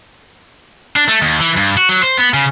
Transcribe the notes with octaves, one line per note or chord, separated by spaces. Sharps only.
D4
A3
D#2
E3
G2
F#4
F#3
C5
B3
C#3